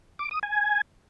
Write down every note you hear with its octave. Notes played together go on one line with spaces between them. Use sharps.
D6
D#6
G#5